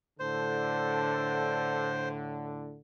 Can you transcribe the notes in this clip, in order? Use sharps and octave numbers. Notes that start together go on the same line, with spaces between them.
A2 D3 A4 C5